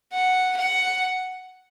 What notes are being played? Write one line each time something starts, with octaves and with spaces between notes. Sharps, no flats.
F#5
F#5